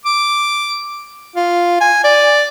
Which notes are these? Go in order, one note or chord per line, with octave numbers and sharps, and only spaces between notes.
D6
F4
G#5
D5